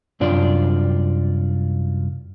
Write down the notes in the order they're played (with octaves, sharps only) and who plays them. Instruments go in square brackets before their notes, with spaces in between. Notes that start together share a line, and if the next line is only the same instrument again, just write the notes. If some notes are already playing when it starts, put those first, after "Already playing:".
[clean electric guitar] C2 F#2 D4 F4 D5